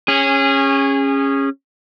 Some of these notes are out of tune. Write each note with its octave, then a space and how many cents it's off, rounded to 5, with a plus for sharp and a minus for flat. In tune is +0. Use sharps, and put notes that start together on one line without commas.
C#4 -10 G#4 -25